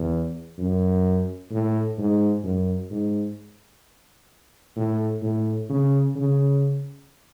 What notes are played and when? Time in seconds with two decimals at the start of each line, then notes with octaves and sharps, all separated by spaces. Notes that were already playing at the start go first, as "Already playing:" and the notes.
Already playing: E2
0.58 F#2
1.51 A2
1.98 G#2
2.44 F#2
2.90 G#2
4.76 A2
5.22 A2
5.69 C#3
6.15 C#3